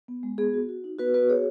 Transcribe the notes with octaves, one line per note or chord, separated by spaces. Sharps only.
B3
G#3
B3 G#4
F#4
F#4
D#4
B3 F#4 B4
B3 F#4 B4
F#4 G#4 C#5